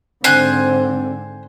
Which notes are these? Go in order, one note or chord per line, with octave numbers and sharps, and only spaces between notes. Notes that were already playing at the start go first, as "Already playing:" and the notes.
G#2 D3 C4 C5 G#5 F#6